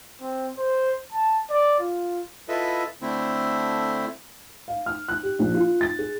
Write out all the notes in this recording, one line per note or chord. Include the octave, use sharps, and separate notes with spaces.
C4
C5
A5
D5
F4
E4 F4 A4 B4 D#5 E5
D3 A3 C4 E4
F5
F6
F#6
G4
A#1
F4
A6
G#4